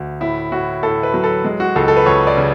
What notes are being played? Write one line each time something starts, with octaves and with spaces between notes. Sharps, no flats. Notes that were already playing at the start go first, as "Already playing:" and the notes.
Already playing: D2
A2 E4
A2 F#4
A2 A4
B4
F#3
A4
G#3
F#4
C#2 A4
A4
B4
C#2 C#5
D5
C#3